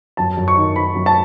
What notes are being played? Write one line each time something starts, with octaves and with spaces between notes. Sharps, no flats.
F#2 A5
F#2
C#6
D#3
D#3 B5
F#2
A5